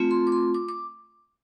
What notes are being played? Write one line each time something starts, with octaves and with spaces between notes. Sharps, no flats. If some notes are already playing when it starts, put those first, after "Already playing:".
Already playing: A3 C4 F4
C6
D6
C6
D6
D6